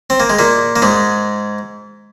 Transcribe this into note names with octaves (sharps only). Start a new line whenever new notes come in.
C4
A#3
G#3
A#2 A#3
A#3
G#2 G#3